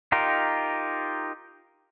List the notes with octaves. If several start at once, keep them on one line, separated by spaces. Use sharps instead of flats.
D#4 F4 G4 A#4